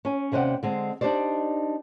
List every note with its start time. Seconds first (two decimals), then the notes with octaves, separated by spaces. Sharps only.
0.05 C#4 G#5
0.32 D#2 C3 C#4 C5 D5 F#5
0.63 D3 G#3 C4
1.01 D4 D#4 G4 C5 D5